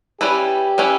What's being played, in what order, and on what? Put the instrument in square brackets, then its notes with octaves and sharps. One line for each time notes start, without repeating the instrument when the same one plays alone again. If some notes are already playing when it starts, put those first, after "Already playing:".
[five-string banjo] G3 C#4 E4 B4 [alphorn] G4
[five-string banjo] G3 C#4 E4 B4